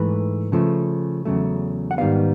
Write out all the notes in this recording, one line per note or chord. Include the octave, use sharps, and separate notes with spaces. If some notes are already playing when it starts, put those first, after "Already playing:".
Already playing: G#2 E3 A3 B4
C#3 F3 A3
E2 C#3 F#3 A3
F#5
G#2 D#3 G3 B3 F5